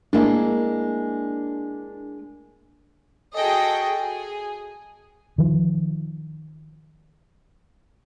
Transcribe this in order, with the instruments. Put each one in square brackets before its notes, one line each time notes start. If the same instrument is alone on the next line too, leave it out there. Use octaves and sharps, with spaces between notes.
[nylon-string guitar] G#3 A#3 E4 [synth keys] D4
[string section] F#4 G#4 A4 D#5 G5
G#4
[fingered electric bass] D#3 F3